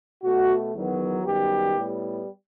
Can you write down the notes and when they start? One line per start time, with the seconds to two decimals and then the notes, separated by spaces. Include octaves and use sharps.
0.23 B2 A3 F#4
0.74 E2 D#3 F#3 B3
1.24 F#2 D#3 G3 B3 G4
1.76 A2 G3 B3